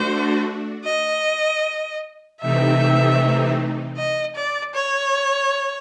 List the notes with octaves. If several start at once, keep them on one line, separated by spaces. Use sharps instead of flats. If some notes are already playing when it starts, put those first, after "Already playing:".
Already playing: A3 D4 F#4 C5
D#5
C3 E3 A3 C4 D#4 E5
D#5
D5
C#5